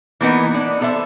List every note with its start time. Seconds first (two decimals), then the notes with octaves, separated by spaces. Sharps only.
0.21 E3 A#3 B3 D#4
0.54 D4 D#4
0.81 B3 A4 C5 E5